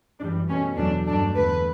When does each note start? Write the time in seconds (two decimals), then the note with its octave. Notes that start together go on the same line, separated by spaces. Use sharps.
0.20 F#2 E3 G3 D4
0.49 B2 A3 C#4
0.78 E2 B2 F#3 A3 D4
1.07 G2 F#3 A3 D4
1.35 E2 D3 A3 B4